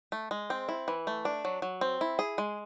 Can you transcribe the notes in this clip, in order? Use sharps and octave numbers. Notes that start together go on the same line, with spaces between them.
A3
G#3
C4
E4
E3
A3
D4
F#3
F#3
C4
E4
G#4
G#3